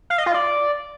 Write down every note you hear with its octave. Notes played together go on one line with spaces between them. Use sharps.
F5
D#5
F4
D5